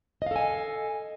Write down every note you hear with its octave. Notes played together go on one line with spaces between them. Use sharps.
A4 D#5 F5 G#5